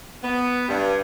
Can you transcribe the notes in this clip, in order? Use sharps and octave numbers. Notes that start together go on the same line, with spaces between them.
B3
G2